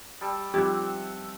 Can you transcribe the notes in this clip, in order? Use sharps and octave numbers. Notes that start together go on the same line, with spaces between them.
G3 A5 E6
F3 G3 C4 D#4 G4 E5 F#5